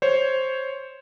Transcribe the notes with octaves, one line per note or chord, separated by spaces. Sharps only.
C5 C#5